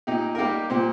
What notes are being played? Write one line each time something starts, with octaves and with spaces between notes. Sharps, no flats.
A#2 D#4 G4
A#4
G3 A#3 D#4 G4
A#2 G4 C5